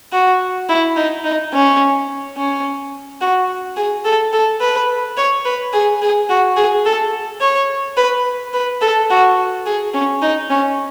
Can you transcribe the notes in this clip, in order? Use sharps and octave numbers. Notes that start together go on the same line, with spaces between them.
F#4
E4
D#4
D#4
C#4
C#4
F#4
G#4
A4
A4
B4
C#5
B4
G#4
G#4
F#4
G#4
A4
C#5
B4
B4
A4
F#4
G#4
C#4
D#4
C#4